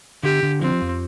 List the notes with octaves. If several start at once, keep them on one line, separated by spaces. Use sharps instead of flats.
D3 G4
D3
F3 C4
F2